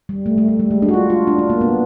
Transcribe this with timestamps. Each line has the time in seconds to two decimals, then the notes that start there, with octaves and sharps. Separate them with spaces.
0.09 G3
0.26 A3
0.38 A3
0.48 A3
0.59 G3
0.71 G#3
0.82 D4
0.88 F#4
0.94 F4
1.10 F4
1.27 D4
1.39 D4
1.50 A#3
1.61 B3